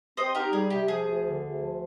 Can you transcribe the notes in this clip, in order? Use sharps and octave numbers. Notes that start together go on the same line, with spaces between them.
C4 C5 D#5
D#4 G4 A#4
G3 G#4
C3 G4
F3 G#4
D2
D3
D2
F3